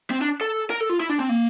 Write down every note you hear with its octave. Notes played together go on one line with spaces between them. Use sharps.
C4
D4
A4
A#4
A4
F4
E4
D4
C4
A#3